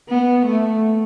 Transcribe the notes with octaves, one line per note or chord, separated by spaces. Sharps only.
B3
A3